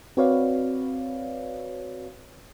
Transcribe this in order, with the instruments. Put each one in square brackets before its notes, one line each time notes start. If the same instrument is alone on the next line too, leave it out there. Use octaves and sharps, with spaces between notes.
[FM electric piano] C4 F#4 B4 C#5 D5 F5